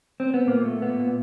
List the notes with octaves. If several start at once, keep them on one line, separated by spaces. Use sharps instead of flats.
C4
B3
A#2 A#3
A3
A#2 B3
A#2